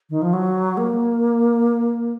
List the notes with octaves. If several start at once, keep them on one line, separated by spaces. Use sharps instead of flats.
D#3
F3
F#3
A#3